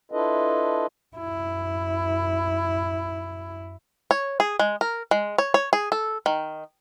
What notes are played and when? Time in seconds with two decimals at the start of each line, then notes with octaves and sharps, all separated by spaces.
0.12 D4 E4 F4 A4 B4 D#5
1.16 F#2 E4
4.11 C#5
4.40 G#4
4.59 G#3
4.81 A#4
5.11 G#3
5.38 C#5
5.54 C#5
5.73 G#4
5.92 A4
6.26 D#3